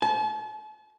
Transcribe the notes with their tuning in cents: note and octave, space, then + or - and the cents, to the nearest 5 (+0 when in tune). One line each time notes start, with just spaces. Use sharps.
A5 -40